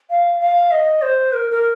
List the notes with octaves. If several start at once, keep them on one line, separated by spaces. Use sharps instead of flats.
F5
F5
D#5
C5
A#4
A#4